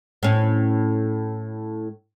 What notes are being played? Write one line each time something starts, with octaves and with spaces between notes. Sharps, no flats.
A2 C#4